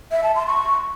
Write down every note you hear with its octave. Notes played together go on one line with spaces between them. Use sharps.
E5
A5
C6
C#6